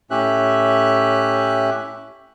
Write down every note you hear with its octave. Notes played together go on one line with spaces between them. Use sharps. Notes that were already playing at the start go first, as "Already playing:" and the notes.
A2 C#4 G4 E5 F#6